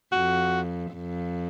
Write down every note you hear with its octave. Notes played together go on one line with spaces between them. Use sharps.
F2 F#4
F2